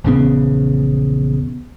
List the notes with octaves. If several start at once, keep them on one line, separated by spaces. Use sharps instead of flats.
A#1 E2 C#3 B3